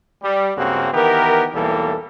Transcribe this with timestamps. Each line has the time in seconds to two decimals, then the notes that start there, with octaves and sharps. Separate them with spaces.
0.23 G3
0.57 C#2 G2 C#3 A#3 C4 F#4
0.94 D#3 E3 B3 G4 A#4
1.53 B1 E2 E3 G3 A#3 A4